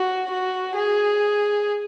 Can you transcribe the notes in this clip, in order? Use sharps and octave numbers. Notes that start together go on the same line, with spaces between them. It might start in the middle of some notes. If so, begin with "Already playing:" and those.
Already playing: F#4
F#4
G#4